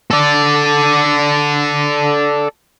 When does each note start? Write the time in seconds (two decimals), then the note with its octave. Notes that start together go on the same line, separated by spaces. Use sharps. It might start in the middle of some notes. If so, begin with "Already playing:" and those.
0.11 A4 D5